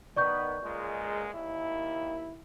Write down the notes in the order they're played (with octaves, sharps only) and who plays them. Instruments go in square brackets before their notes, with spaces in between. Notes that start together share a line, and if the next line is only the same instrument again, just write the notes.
[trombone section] D#3 B3 [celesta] D5 C#6 G6
[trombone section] C#2 A#2 G#3
D#2 E4